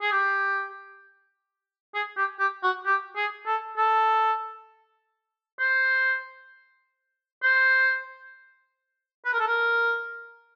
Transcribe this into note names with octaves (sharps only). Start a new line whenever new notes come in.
G#4
G4
G#4
G4
G4
F#4
G4
G#4
A4
A4
C5
C5
B4
A#4
A4
A#4